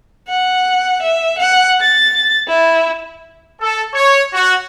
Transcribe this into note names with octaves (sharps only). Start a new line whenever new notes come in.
F#5
E5
F#5
A6
E4
A4
C#5
F#4